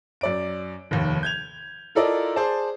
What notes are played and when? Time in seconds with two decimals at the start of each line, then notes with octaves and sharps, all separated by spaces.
0.21 F#2 D5 D7
0.91 F1 D#2
1.23 G6 G#6 F7
1.95 E4 F4 A4 A#4 D5 D#5
2.36 G#4 C5 D5 A5